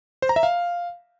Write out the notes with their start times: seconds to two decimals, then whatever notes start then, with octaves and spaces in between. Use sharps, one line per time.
0.22 C5
0.29 A#5
0.36 E5
0.43 F5